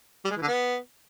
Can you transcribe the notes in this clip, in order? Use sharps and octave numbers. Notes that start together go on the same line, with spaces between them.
G3
G#3
E3
D3
B3